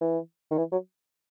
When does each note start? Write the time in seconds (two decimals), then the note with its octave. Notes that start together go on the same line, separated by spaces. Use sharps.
0.01 E3
0.51 D#3
0.58 E3
0.72 F#3